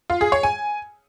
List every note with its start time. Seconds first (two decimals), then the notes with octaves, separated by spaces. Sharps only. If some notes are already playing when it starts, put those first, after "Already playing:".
0.10 F4
0.21 G#4
0.32 C#5
0.43 G#5